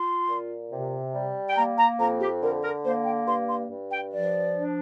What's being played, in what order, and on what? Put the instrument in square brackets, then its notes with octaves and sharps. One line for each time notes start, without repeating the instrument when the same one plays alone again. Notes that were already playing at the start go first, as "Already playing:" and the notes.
Already playing: [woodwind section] F4 C6
A#2
C3
G3
G5
A#3 A#5
A#5
F2 A#5
G4
D3 A#4
A#4
A#3 C5
G5
G2 C6
C6
G2
G5
F3 D5
D4